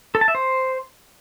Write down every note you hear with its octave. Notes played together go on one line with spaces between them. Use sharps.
A4
A5
E5
C5